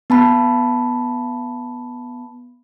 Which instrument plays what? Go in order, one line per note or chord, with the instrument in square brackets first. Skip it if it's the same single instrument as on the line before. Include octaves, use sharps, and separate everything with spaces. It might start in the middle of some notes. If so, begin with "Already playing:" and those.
[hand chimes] B3 A5 B5